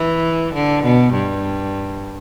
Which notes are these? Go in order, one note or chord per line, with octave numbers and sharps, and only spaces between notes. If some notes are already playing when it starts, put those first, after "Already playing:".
Already playing: E3
D3
B2
G2